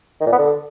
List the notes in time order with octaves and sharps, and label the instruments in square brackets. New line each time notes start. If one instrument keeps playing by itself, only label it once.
[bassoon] D#3
A#2
B3
D3